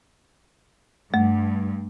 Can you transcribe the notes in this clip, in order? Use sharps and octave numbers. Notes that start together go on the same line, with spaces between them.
G2 A3